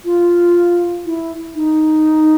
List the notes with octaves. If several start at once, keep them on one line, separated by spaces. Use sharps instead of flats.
F4
E4
D#4